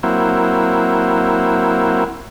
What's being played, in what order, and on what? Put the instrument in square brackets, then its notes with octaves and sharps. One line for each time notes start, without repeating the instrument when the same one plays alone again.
[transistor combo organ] F#3 A#3 C4 E4